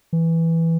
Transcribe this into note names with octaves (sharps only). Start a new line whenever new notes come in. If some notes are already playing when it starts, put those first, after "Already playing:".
E3